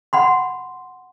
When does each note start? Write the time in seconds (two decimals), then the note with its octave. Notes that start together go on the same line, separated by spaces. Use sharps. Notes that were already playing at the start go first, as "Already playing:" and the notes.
0.13 F#5 B5 C6